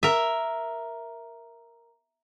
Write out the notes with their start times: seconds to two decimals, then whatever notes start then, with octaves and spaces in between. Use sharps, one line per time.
0.03 A#4 E5